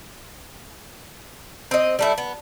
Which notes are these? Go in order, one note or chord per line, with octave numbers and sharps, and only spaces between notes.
C4 D#5
G3 A3 E4
B3